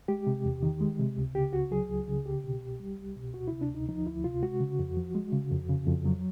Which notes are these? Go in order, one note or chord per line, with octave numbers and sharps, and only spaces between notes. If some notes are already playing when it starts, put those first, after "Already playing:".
G#3 G4
C3
E2
D#3
G#3
C3
C#2
C#3 G4
C#2 F#4
F#3 G#4
C#2
C#3
C2 G4
B2
C2
G3
C2
B2
D2 F#4
E4
C3
D4
D2 D#4
F3 D#4
D2 E4
C3 F4
G#3 F#4
C#3
F2
F3
G#3
C#3
F2
C#3
F2
F#3